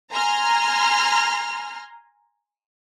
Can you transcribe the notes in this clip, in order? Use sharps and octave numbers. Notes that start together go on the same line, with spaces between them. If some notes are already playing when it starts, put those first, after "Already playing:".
G#5 A#5 C6 F6